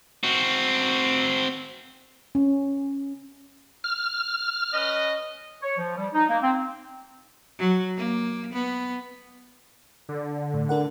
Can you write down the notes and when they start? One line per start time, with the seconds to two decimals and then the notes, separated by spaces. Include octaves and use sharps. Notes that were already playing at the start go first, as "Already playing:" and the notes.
0.23 C4 F#4
2.35 C#4
3.84 F6
4.73 C#4 B4 D#5
5.62 C#5
5.77 F3
5.96 G3
6.13 D#4
6.30 A#3
6.42 C4
7.59 F#3
7.97 A#3
8.53 B3
10.09 D3
10.54 A2
10.69 D4 A#4 F#5